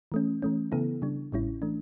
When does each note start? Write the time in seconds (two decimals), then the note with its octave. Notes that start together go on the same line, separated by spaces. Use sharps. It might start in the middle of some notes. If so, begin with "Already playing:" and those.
0.12 E3 A3 C#4
0.42 E3 A3 C#4
0.72 C#3 E3 B3 E4 A4
1.02 C#3 G3 D4
1.32 A1 A2 G3 C#4 E4
1.62 E3 A3 D4